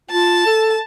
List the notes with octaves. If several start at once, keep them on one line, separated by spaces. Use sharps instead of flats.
F4 A5
A4